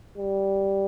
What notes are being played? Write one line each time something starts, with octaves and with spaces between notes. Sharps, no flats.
G3